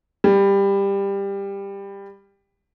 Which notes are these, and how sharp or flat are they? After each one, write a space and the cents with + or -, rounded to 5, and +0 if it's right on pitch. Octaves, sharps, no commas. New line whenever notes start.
G3 +15